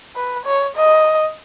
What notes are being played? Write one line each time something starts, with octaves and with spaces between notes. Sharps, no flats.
B4
C#5
D#5